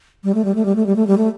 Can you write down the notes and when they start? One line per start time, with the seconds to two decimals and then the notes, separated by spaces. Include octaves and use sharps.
0.24 G3
0.35 A3
0.45 G3
0.55 A3
0.65 G3
0.76 A3
0.86 G3
0.96 A3
1.07 G3
1.18 A3